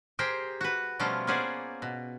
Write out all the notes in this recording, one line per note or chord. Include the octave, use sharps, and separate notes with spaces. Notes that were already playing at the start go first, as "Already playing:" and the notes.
G4 G#4 A#4 C5 G5
F#4 B4
B2 F3 G3 A3 C#4 F4
A#3 B3 C#4 G#4 C5 D5
B2